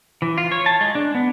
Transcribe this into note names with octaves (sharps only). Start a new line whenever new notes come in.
E3
F4
C#5
A5
G#3
D4
B3